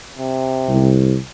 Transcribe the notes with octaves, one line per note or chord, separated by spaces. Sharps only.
C3
C2